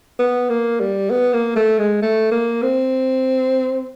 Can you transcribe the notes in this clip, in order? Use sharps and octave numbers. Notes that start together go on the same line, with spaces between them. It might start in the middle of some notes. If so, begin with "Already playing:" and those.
B3
A#3
G3
B3
A#3
A3
G#3
A3
A#3
C4